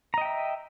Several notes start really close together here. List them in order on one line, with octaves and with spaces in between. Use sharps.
A#5 D#5 G5 E5